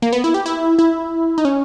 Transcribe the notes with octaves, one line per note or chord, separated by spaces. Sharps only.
A#3
B3
E4
G4
E4
E4
D#4
C#4